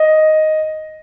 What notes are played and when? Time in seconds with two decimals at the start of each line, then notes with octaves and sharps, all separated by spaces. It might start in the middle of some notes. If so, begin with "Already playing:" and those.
Already playing: D#5